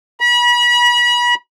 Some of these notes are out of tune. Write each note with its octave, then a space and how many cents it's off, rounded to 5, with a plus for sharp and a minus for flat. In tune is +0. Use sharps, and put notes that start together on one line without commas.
B5 -35